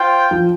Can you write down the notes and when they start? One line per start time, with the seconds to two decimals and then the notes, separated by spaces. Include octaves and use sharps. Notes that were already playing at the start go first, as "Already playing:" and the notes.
Already playing: F4 C5 G5
0.31 F3